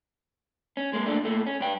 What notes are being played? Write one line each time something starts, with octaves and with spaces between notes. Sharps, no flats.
C#4
G#3 A#3
A#2 A3 D4
A#2 A3
C#4
G2 G5